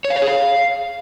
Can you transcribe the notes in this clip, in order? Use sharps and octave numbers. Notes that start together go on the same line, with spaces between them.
C#5
F5
C#5
G#4
F5